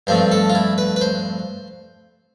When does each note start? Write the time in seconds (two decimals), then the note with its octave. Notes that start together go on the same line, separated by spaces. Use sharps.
0.07 G2 F3 A3 C4 C5
0.32 A4
0.50 F4
0.55 E4
0.78 B4
0.96 B4
1.01 C5